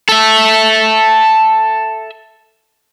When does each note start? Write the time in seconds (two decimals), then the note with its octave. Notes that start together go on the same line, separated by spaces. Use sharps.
0.09 A4 E5